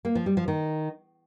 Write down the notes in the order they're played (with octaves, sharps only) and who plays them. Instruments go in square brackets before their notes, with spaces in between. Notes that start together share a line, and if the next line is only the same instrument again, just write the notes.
[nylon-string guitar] A#3
F3
G3
F3
D#3